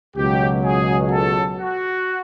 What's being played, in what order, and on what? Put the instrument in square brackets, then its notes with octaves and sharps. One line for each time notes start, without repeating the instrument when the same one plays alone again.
[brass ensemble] C#2 B2 F#3 G4
G#4
A4
F#4